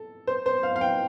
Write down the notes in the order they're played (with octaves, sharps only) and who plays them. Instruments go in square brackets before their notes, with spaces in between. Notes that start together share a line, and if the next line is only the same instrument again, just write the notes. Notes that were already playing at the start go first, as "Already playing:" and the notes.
Already playing: [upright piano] A4
C5
C5
F5
F5
G5